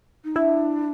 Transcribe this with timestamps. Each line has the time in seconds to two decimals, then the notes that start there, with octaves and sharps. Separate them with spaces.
0.24 D#4
0.35 D4 E4